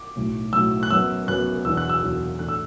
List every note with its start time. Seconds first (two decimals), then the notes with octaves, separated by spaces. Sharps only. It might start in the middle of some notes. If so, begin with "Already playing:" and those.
Already playing: D6
0.16 B1 A2 F#3
0.53 B1 A2 F#3 E6
0.83 F#6
0.90 F#2 F#3 B3 E6
1.28 F#2 F#3 B3 F#6
1.65 E2 B2 F#3 D4 E6
1.77 F#6
1.89 E6
2.02 E2 B2 F#3 D4
2.39 A2 E3 A3 D4 F#6
2.49 E6